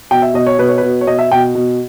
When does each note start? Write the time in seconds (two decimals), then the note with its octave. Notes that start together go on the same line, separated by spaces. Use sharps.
0.11 B2 G5
0.22 E5
0.34 B2 D#5
0.47 C#5
0.58 B2 B4
0.69 C#5
0.78 B2 B4
1.01 C#5
1.07 B2 D#5
1.19 E5
1.32 B2 G5
1.55 B2